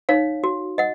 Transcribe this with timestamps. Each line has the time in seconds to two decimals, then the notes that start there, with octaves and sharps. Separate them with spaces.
0.09 D#4 C#5 F5
0.44 F#4
0.78 D#5 F#5